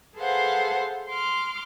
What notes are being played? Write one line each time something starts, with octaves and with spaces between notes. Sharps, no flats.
G#4 A4 B4 C5 F5 F#5
C6 D6 F6